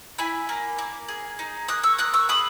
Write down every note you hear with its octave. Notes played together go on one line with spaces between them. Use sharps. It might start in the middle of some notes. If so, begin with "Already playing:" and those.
E4 G#5 B5
A#3
A#3
G#4
D#4
A#3 D#6 F#6
C#6 E6
A#3 D#6 F#6
C#6 E6
G#4 B5 D#6